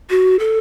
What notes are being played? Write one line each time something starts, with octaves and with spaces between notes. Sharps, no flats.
F#4
A4